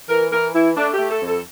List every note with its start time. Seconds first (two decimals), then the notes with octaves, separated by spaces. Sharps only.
0.09 E3 A#4
0.31 E3 A#4
0.54 E3 E4
0.76 A3 D4
0.93 G4
0.99 A3
1.10 A4
1.21 F2
1.26 A4